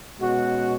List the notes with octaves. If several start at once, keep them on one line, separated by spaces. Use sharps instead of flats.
B2 G#3 C#4 F#4